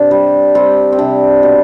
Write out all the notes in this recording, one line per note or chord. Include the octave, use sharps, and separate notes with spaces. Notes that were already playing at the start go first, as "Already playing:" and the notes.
Already playing: C3 D4
G3
G3 C4
C4
C3 D4
B2